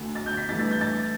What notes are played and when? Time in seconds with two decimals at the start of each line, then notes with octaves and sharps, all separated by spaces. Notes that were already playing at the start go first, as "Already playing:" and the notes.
Already playing: D2 D3 A3
0.15 A6
0.26 G6
0.37 B6
0.49 G2 E3 A3 A6
0.59 A6
0.71 G6
0.81 A6